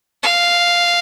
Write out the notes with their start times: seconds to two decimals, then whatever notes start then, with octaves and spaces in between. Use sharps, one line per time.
0.23 F5